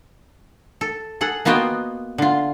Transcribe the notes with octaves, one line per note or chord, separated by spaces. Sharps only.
A4
G#4 A4 F#5
A#3 B3 F4 F#4 D#5 G5
D3 F4